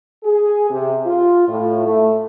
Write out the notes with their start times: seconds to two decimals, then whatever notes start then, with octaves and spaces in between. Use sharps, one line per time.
0.24 G#4
0.69 C3
1.05 F4
1.46 A2
1.85 A3